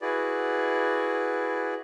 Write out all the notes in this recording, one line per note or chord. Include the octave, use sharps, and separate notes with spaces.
E4 F#4 G#4 B4 D5